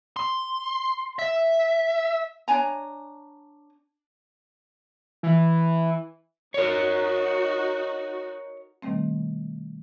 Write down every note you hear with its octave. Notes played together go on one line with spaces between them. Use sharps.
C6
E5
D4 C#5 G#5 A#5
E3
D#4 F#4 A#4 C#5
B2 D#3 G3 A3 C4